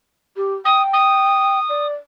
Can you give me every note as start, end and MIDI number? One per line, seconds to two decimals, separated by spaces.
0.36 0.54 67
0.65 1.60 79
0.65 0.82 87
0.93 1.86 87
1.69 1.94 74